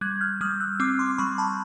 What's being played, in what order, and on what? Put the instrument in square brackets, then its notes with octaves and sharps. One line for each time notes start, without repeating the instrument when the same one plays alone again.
[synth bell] G3 F#6 G#6
F6 G6
G3 D#6 F6
E6 F#6
C4 D6 E6
C6 D6
G3 B5 C#6
A5 B5